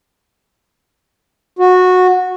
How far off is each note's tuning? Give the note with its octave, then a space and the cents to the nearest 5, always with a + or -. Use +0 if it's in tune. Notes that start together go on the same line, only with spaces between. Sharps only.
F#4 -15